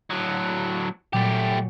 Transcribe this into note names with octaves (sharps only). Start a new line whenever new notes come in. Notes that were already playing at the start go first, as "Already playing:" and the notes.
A2 F#3
A#2 F#3 A3 G4